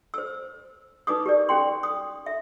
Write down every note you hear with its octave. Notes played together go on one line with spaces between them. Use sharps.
C5 E6
D#4 B4 D6 D#6
G4 A#4 D5
C#4 G4 G5 C6
D#6
E5